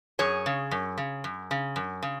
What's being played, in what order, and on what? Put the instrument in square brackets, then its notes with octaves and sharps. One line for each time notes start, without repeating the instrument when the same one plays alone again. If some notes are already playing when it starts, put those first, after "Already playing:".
[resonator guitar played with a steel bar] F#2 G#4 C#5
C#3
F#2
C#3
F#2
C#3
F#2
C#3